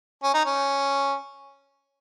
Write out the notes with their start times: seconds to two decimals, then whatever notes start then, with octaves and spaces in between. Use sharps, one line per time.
0.23 C#4
0.34 D#4
0.45 C#4